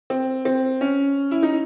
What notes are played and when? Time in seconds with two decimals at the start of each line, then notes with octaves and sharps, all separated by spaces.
0.10 C4
0.45 C4
0.81 C#4
1.31 E4
1.43 D#4